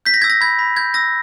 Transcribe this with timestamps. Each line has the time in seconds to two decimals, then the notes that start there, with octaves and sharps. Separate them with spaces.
0.05 G6 B6
0.14 A#6
0.22 E6 G#6
0.30 A#6
0.41 B5 G#6
0.59 B5
0.77 G6 G#6
0.94 E6 A#6